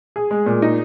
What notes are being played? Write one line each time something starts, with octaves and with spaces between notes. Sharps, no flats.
G#4
G#3
A#2
D#4